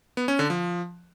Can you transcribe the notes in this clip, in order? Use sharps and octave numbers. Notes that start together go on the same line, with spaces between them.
B3
C#4
D3
F3